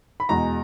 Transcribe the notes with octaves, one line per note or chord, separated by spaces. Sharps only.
B5
E2 B2 G#3 A#5